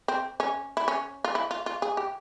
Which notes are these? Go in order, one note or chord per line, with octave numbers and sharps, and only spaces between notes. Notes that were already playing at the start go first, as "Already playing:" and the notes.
C4
C#4
E4
C#4
F4
E4
F4
F4
G#4
G4